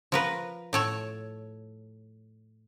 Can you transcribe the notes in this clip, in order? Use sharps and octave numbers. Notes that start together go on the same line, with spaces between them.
F3 A#4 B4
A2 A4 C#5